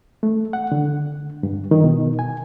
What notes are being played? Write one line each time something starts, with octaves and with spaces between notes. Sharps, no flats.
A3
F#5
D3
G2
D#3
B2
G#5